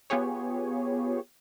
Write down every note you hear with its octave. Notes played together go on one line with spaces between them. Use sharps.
B3 F4 G4 G#4 C#5